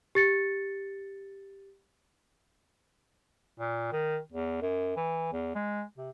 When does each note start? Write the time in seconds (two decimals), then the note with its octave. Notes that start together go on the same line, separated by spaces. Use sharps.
0.15 G4 A6 C#7
3.59 A#2
3.92 D#3
4.32 E2
4.62 F#2
4.96 E3
5.32 E2
5.55 G#3
5.97 C3